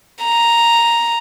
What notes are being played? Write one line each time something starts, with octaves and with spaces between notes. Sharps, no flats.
A#5